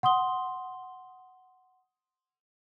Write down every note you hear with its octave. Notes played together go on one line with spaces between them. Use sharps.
F#5 C6 D#6 G7